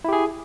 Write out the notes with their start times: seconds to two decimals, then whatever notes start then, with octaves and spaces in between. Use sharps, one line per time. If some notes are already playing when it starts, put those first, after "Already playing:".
0.04 E4
0.09 G4
0.13 G#4